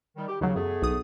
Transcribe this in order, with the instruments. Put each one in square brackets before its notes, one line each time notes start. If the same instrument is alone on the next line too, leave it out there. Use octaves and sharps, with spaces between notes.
[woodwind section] D#3 G3
G4
[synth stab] D#2 F#3 [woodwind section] C#3
[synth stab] F#2 [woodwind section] A3 B3 G#4
[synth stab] B1 D#6